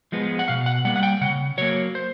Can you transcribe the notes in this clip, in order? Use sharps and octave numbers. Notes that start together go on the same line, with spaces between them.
F3 G#3 B3
F#5
B2 F5
F#5
G3 A#3 F#5
F#5
G5
C#3 F#5
F#3 A#3 C#5
C5